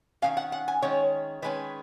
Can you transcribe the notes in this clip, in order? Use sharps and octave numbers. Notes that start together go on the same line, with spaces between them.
D#3 G#3 C#4 F5
F#5
F#5
G#5
D#3 G#3 C#4 C#5
D#3 G#3 C#4 B4